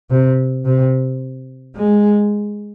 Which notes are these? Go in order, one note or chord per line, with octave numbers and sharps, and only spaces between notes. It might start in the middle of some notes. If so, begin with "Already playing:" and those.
C3
C3
G#3